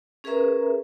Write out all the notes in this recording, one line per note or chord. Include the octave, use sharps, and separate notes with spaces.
C#4 G#4 A#4 B4 E5 A#5